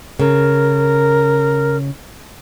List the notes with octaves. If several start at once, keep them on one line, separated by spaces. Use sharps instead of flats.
C#3 A#4